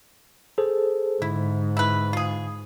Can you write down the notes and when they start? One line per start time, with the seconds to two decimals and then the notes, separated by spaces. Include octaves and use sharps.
0.58 G#4 A4 C5
1.22 G#2 D3 E4
1.77 E4 B4
2.13 F4 G#4